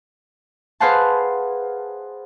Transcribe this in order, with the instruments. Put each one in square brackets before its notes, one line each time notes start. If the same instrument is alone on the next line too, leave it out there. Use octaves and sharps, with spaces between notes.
[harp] G#4 B4 C5 F5 F#5 A5